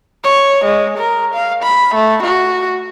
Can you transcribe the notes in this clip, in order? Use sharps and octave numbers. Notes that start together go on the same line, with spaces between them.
C#5
G#3
A#4
F5
B5
A3
F#4